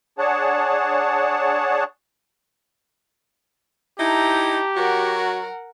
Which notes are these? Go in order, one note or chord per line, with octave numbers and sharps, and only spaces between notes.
D4 G#4 C#5 F#5 A5
D#4 E4 G4 A5 A#5
F#3 F#4 A#4 F#5